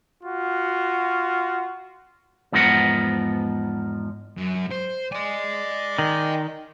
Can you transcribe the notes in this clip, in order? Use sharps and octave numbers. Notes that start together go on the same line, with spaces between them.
F4 F#4
E2 G#2 F3 B3 A#4 F#5
F#2
C5
D5 D#5 G#5
D#3